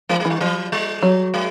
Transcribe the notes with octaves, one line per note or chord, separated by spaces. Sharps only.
F3 G#3
G#3
E3
G3
F3 F#3
G3
F#3
G#3